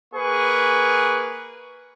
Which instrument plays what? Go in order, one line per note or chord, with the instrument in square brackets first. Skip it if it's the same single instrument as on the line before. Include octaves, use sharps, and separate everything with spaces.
[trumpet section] A#3 G#4 B4 C#6